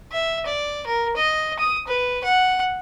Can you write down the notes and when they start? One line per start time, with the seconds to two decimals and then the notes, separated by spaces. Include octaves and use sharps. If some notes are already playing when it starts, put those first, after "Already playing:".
0.12 E5
0.46 D5
0.87 A#4
1.16 D#5
1.59 D#6
1.88 B4
2.24 F#5